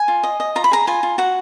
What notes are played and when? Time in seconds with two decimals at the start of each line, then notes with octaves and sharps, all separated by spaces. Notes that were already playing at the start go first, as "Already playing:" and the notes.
Already playing: G#5
0.08 F4
0.23 D#5
0.40 D#5
0.56 F4 A#5
0.64 B5
0.71 G#4 A#5
0.87 F4 G#5
1.03 F4
1.18 F#4 F#5